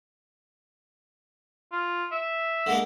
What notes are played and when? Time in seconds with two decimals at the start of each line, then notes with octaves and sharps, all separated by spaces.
1.72 F4
2.12 E5
2.67 D3 G#3 A#3